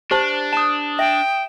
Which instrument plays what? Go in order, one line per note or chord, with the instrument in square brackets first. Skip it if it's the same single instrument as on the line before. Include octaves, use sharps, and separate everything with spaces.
[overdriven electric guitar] D4 [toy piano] G4 C5 A5
[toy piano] A5 [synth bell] D#6 E7
[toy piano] E5 [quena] G5